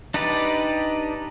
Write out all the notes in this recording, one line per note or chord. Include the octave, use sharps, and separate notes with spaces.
D4 D#4 G4 B4 D5